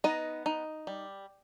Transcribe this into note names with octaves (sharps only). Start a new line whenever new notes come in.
B3 D#4 D#5
D#4
G3